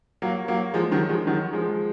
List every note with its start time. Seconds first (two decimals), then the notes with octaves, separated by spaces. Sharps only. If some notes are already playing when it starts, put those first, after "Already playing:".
0.22 F#3 A#3
0.48 F#3 A#3
0.74 F3 G#3
0.92 D#3 F#3
1.09 F3 G#3
1.27 D#3 F#3
1.53 F3 G#3